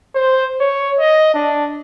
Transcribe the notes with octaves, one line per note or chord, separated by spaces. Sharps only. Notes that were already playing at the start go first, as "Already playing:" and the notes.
C5
C#5
D#5
D4